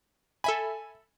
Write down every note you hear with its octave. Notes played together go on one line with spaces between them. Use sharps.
A4 E5 G#5 B5